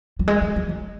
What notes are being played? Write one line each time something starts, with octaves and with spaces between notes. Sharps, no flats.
F#3
G#3
F#3
F#3
F#3